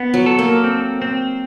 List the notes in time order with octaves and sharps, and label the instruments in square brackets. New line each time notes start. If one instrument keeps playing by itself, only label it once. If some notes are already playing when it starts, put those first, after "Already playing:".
Already playing: [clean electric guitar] B3
[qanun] F#3
[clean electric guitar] A4
[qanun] A#3
[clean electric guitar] C4
C4